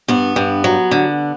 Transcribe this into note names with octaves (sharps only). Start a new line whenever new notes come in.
G2 B3
G2
F#3
D3